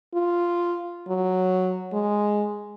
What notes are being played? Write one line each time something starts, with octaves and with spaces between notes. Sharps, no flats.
F4
F#3
G#3